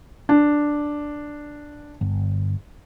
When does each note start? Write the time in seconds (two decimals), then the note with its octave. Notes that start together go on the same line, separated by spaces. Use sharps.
0.29 D4
2.01 G1